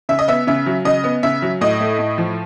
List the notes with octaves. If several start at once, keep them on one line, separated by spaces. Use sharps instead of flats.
C#3 E5
D#5
B3 E5
C#3 E5
F#3
C#3 D#5
B3
C#3 E5
F#3
A2 D#5
A3
A2
F3